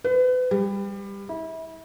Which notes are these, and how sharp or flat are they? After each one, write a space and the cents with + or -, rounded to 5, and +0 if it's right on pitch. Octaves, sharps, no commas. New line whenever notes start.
B4 +35
G3 +25
E4 -30